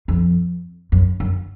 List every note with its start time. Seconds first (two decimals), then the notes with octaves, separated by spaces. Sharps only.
0.08 F2
0.92 F#2
1.20 F#2